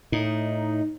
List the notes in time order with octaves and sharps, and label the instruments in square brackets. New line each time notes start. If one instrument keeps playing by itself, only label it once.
[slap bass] A2 [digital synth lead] D#4